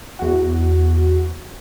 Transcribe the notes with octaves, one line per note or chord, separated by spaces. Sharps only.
E2 F#4